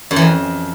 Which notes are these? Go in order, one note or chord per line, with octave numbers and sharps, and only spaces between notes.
F#2
E3
F2